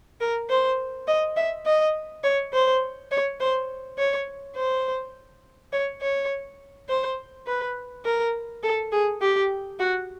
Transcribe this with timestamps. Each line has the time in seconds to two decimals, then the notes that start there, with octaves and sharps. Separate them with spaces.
0.21 A#4
0.50 C5
1.08 D#5
1.36 E5
1.66 D#5
2.24 C#5
2.53 C5
3.11 C#5
3.40 C5
3.98 C#5
4.56 C5
5.73 C#5
6.01 C#5
6.89 C5
7.47 B4
8.05 A#4
8.63 A4
8.92 G#4
9.21 G4
9.80 F#4